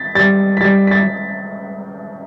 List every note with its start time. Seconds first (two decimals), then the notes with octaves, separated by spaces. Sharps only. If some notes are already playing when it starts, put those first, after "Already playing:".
Already playing: A6 B6
0.15 G3 A6
0.57 B6
0.61 G3 A6
0.87 B6
0.91 A6